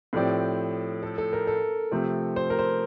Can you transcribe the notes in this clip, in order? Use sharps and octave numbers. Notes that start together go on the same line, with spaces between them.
A2 F3 C4 G4 A4 D5
A4
A4
A#4
A4
C3 F3 A3 C4
C5
A#4
C5